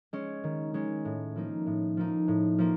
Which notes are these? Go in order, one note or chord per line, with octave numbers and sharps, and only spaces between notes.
G#3 C#4
D#3
G#3 C#4
A2
F3 A#3 D#4
A2
F3 A#3 D#4
A2
F3 A#3